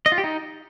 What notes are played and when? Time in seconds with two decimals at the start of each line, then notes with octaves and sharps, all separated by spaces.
0.06 D#5
0.12 F4
0.18 G4
0.24 D#4